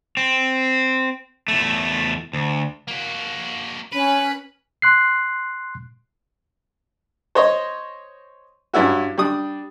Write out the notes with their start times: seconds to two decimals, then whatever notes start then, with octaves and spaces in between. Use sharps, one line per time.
0.17 C4
1.48 E2 A3
2.33 D2
2.88 A#3 F#4
3.92 C#4 B4
4.82 C6 F#6 C7
7.35 C5 C#5 D#5
8.74 G2 C#4 E4 F#4
9.18 G3 D4 D#6